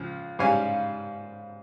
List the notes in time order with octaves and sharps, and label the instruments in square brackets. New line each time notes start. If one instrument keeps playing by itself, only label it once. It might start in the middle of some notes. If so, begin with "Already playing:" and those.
Already playing: [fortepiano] C#2 F3
G#2 G3 C#4 F5 G#5